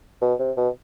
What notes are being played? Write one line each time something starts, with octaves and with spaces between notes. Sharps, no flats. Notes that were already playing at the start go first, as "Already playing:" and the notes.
B2
C3
B2